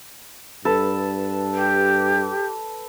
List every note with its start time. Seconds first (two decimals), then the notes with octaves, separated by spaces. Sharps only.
0.65 G2 A4 B4 A5
1.54 G4